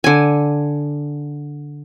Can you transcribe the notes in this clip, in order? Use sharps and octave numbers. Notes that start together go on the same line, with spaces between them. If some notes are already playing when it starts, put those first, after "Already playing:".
D3 G#5